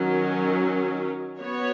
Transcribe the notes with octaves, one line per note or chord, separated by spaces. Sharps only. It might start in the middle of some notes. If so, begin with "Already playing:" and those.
Already playing: D#3 F#3 C#4
B3 F#4 C#5